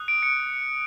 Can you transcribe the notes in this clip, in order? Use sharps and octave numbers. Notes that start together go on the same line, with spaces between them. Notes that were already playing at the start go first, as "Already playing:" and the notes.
Already playing: D#6 F#6
D7
C#7